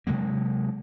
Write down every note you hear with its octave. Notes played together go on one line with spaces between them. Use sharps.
C3 F#3 G#3 A#3